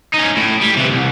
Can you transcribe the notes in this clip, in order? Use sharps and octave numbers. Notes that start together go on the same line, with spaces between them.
C#4 D#4
A2
G3
C3 E3
C2